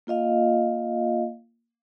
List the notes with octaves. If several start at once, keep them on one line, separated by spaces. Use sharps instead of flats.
A#3 F4 D#5 F5